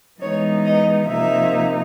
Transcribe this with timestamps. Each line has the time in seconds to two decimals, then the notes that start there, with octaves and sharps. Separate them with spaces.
0.21 E3 G#3 B3 D#4 C#5
0.65 D#5
1.08 C3 F3 A#3 D#4 E5